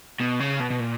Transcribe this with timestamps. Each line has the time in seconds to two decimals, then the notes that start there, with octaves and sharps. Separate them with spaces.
0.21 B2
0.40 C#3
0.60 B2
0.70 B2
0.80 A#2